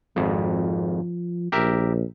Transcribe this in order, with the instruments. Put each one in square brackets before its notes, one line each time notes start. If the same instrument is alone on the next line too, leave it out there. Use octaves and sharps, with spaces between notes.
[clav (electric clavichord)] G#1 F2 [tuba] F3
[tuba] A#1 [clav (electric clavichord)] G4 A#4 E5